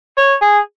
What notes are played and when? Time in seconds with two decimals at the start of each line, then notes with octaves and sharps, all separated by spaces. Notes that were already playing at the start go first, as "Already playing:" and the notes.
0.17 C#5
0.41 G#4